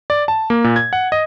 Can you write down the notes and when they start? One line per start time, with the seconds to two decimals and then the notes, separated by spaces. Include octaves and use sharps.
0.10 D5
0.28 A5
0.50 A#3
0.64 A#2
0.76 G#6
0.93 F#5
1.12 D#5